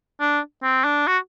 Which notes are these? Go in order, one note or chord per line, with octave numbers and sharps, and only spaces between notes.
D4
C4
D4
F#4